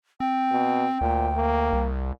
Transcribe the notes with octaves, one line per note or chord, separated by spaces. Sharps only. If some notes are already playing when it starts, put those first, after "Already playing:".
C4 G5
B2
D2 A#2
A#3
C2